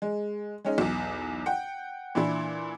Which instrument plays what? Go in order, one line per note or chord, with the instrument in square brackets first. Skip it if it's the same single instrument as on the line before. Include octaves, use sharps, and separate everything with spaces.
[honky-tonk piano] G#3
G#3 C#4 D#4
B1 E2
F#5 G5
A#2 E3 D4 E4